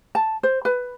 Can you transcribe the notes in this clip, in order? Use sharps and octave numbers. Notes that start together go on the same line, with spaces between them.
A5
C5
B4